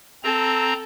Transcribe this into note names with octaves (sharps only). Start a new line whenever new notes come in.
C4 A4 A#5